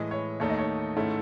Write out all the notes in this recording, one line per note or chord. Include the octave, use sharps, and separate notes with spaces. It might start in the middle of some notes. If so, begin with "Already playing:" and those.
Already playing: A2 E3 G#3 D#5
C#5
D#2 D#3 A3 D#4 C#5
D#5
C#5
G#2 D#3 A3 C#4 E4